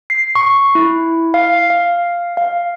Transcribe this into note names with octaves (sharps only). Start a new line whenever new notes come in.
C7
C#6
E4
F5
F5
F5